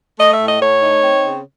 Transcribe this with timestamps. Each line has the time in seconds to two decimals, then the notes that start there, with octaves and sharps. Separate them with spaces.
0.19 A3 D#5
0.33 E5
0.40 A2
0.47 D#5
0.61 A3 C#5
0.82 D#4
1.04 C4
1.25 C#3